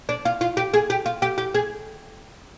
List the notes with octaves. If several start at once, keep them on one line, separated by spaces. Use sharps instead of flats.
D4
F4
F4
G4
G#4
G4
F4
G4
G4
G#4